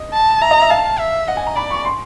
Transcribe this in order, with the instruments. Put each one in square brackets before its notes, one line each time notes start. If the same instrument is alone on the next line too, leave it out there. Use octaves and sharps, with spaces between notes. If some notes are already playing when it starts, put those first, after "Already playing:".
Already playing: [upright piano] D#5
[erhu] A5
[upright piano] E5 [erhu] A#5
[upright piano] D#5
E5
[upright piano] F5 [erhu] A5
[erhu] E5
[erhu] D#5 [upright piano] F#5
[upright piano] G#5
A#5
[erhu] D5 [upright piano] B5
[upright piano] C#6
C6